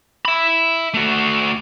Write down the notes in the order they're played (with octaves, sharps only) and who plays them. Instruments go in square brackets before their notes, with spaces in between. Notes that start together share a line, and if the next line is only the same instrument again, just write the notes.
[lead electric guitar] E5 B5
A3 F#4